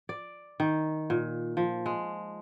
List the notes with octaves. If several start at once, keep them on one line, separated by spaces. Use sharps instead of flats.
D5
D#3
A#2
F3
G#3